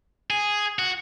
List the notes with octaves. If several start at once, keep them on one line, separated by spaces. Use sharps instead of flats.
G#4
F#4